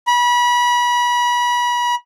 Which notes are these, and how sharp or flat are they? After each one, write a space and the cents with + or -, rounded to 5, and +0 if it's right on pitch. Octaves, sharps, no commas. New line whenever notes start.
B5 -30